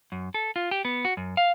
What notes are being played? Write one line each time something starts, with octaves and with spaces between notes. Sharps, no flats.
F#2
A4
F4
G4
B3
F#4
F#2
F5